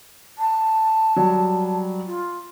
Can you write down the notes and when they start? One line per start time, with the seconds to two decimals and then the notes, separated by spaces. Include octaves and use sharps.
0.38 A5
1.16 F#3 G3
2.06 F4